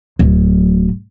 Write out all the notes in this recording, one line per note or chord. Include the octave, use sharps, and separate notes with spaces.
D1 F#3